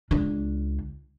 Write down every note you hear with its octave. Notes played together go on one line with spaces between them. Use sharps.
C#2 D4